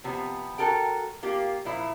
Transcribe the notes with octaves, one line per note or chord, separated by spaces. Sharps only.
C3 F3 B3
F#4 A4 A#4 G5
A#3 F4 G4
A#2 F3 E4